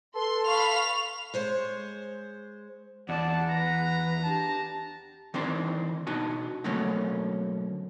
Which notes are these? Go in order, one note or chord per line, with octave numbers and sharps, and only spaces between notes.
A4 B4 C6
F5 B5 C#6 F7
G#3 C5 C#5
E2 D5 F#5 A5
B4 A#5
D4 G4 A5
D#3 E3 C4 D4 C5
B2 D4 D#4 F#4 G#5
B2 D3 F#3 A3 A#3 C#4